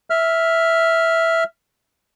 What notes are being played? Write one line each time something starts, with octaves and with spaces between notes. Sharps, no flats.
E5 F6